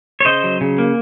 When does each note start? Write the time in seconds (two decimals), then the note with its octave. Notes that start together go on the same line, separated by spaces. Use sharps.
0.20 C#5
0.25 C#3 C5 D#5
0.44 F#3
0.61 C#3
0.78 A#3